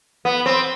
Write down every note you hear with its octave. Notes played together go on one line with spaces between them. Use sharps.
B3
C4